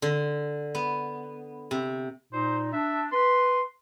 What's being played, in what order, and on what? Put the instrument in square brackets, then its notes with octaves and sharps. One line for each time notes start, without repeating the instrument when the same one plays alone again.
[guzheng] D3
B3
C3
[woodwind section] A#2 D#4 [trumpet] C5
[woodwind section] D4 [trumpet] E5
[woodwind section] B4 [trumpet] C6